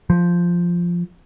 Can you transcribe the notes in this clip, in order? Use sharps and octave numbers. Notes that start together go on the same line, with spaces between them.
F3